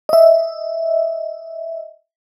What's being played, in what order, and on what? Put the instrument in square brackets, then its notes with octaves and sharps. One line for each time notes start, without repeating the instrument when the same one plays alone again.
[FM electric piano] D#5 E5